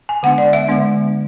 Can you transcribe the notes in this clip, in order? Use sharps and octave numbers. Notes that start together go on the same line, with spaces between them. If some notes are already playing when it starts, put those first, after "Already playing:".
G#5
D3 G#3 B3 D4 F#5
D5
E5
D3 G#3 B3 D4